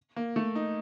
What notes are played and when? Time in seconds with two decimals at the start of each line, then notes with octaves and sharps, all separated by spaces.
0.16 A#3
0.36 A3
0.55 D#4